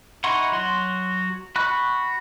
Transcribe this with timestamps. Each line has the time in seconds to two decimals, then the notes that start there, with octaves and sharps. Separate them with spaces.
0.24 D#4 E4 F#5 C6 C#6
0.52 F#3 F#4 C6
1.56 F#4 B5 C#6 F#6